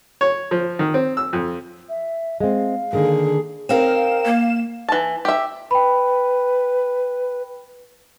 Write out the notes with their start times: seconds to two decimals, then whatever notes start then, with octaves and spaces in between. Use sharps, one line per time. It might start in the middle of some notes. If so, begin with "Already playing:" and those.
0.21 C#5
0.51 F3
0.79 D#3
0.94 C4
1.17 E6
1.33 F2
1.89 E5
2.40 G#3 C4 F5
2.93 D3 D#3 A#3 G#4
3.69 C4 D#4 A#4 F5 E7
4.25 A#3
4.89 E3 A5
5.25 G4 E5
5.71 B4 G5 B5